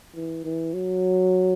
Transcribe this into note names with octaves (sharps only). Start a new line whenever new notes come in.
E3
E3
F#3